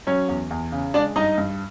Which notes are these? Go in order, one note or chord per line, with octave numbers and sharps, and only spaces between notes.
F#3 C#4 C#5
E2
E2
C#3
G#3 D4 D5
G2 D#4 D#5
G2